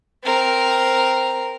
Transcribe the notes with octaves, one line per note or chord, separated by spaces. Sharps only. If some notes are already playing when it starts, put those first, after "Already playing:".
C4 A#4